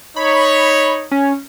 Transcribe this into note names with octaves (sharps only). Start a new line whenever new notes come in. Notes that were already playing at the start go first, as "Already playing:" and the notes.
D#4 C#5 B5
C#4